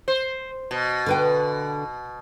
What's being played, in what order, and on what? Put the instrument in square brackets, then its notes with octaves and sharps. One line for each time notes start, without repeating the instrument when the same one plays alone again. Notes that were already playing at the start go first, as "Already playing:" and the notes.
[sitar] C5
B2
[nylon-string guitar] D3 B4 G5